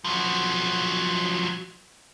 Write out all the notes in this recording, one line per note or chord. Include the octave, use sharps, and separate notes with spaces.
F3 F#3